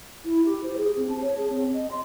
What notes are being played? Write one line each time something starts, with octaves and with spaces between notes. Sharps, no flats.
E4
G4
C5
G#4
C4
A5
C#5
G#4
C4
D#5
C6